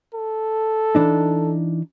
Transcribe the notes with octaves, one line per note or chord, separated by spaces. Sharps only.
A4
E3 D4 D#4